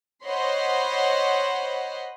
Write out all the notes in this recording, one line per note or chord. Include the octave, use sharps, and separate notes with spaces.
C5 C#5 D#5 F#5 B5 C6